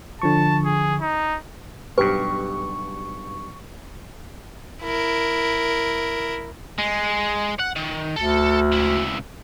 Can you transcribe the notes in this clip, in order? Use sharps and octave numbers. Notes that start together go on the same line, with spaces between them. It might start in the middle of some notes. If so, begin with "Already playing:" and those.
D3 F3 A5 C#6
G#4
D#4
B1 G2 G4 B4 C#6
E4 A#4
G#3
F#5
D#3
D2 A4
C#2 E4